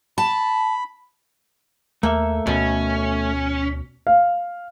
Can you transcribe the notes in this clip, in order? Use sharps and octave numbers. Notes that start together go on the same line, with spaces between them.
A5 B5
D#2 A3 A#3 A4 E5
D2 B2 C#4
F5